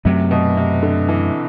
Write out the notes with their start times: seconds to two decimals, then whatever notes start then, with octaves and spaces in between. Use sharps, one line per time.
0.05 F#2 C3 F#3 A3
0.31 B2
0.57 C3
0.83 D3
1.09 E3